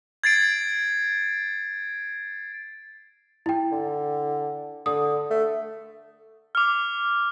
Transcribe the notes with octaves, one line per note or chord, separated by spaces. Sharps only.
G#6 A6 C7 D7
E4 G5
D3
D3 D#6
A3
D6 F6